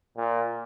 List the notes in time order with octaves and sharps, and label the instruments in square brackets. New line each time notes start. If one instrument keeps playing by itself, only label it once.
[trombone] A#2